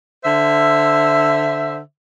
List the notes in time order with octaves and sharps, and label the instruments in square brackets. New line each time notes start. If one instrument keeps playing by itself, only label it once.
[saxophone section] D3 C5 E5